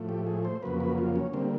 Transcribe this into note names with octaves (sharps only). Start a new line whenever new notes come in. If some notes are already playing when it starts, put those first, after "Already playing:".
Already playing: A2 F3 A3
G4
G#4
C5
F2 C#3 F#3 A#3 B4
B4
F4
C#4
D3 G3 A#3 C4